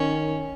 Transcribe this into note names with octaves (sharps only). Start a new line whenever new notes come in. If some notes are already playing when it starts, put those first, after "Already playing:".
Already playing: D#3 C#4